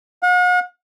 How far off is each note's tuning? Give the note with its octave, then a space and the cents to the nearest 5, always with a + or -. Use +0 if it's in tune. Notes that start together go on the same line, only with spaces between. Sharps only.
F#5 -45